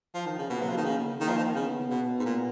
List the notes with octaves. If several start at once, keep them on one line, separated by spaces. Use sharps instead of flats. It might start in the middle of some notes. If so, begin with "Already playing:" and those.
F3
D#3
C#3
B2 A#3
F#3
F3
D#3
C#3
D#3 A#3
F3
D#3
C#3 B3
B2
G#2
A#2